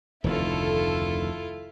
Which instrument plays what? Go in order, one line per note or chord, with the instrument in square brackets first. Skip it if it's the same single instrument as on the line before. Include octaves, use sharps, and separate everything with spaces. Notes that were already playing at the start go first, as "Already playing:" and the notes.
[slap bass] F1 D2 D#3 [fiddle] E4 F4 [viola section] A4